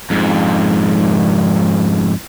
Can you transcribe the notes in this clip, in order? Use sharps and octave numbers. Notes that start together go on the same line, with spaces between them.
F2 G#2